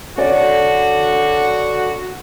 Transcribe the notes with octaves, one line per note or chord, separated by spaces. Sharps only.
D3 F#4 A4 C#5 D5